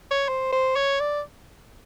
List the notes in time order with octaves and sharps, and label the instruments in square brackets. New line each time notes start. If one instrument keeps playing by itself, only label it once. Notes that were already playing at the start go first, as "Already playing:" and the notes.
[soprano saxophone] C#5
C5
C5
C#5
D5